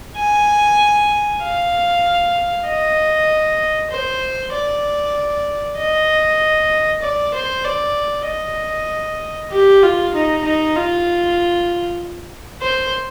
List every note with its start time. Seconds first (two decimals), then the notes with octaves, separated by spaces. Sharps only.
0.17 G#5
1.43 F5
2.67 D#5
3.91 C5
4.53 D5
5.78 D#5
7.03 D5
7.34 C5
7.65 D5
8.27 D#5
9.52 G4
9.83 F4
10.14 D#4
10.45 D#4
10.76 F4
12.62 C5